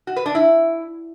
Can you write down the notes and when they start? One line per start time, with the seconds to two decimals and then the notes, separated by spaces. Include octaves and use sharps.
0.07 F#4
0.16 B4
0.26 D4
0.35 E4